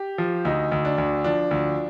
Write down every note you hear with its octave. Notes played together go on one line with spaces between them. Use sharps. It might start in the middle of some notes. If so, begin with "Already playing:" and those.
Already playing: G4
F3
D2 D#4
D2
D4
D2
F3 D4
D2